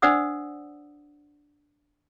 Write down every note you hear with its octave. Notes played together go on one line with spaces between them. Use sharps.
D4 C5 D5 F#5 D#6 E6